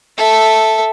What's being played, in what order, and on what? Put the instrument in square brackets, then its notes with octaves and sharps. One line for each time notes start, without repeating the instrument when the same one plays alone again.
[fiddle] A4 E5